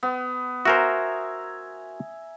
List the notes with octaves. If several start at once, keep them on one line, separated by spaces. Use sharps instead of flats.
B3
F#4 A#4 C5 E5 G#5 A#5